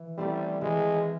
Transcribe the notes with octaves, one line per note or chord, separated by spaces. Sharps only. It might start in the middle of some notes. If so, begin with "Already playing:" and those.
Already playing: E3
G3 A3 C4 E4
E3 G#3